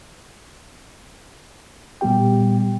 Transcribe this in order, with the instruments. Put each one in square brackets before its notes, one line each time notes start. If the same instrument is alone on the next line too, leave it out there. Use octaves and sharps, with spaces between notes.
[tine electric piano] A#2 G3 B3 G4 G5